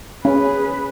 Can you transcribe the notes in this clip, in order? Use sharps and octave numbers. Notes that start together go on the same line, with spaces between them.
C#4 G#4 B4